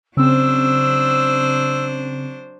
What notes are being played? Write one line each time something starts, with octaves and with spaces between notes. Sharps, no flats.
C#3 F#3 C4 D4 C5 E6